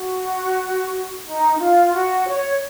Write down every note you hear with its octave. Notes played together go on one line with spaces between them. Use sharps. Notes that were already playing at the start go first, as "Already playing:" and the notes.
Already playing: F#4
D#4
F4
F#4
C#5